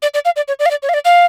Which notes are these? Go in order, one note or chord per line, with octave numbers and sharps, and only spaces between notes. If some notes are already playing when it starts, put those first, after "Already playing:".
D5
D5
F5
D5
C#5
D5
F5
D5
C#5
F5
D5
F5